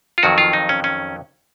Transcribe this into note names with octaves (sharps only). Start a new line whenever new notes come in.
F4
F2 D#3 F#3 F#4
F4
D#4
C#4
C#4